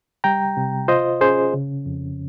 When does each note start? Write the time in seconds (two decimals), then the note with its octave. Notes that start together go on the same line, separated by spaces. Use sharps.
0.24 G3 G5 A#5
0.57 C3
0.88 F4 C5 D#5
1.21 C#4 G#4 C5
1.54 C#3
1.86 F2